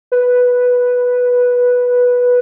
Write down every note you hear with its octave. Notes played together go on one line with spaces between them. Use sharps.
B4